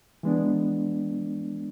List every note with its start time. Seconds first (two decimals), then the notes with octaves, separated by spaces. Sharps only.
0.23 E3 G#3 B3 D4